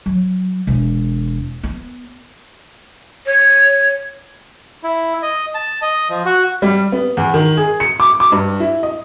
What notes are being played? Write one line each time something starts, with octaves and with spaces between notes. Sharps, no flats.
F#3
E1
B3
C#5
E4
D#5
A5
D#5
F3
F#4
G3
B3
E2
D#3
G#4
C#7
D6
D6
G2
E4
D#5